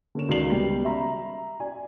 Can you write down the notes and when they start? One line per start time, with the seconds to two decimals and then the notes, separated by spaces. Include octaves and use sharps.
0.15 D3 A#3 C#4 E7
0.29 C#2 D#3 F#4 D5 C7 F#7
0.50 C#2 G3 B3 C7
0.85 E5 A#5 B5
1.60 D5 G#5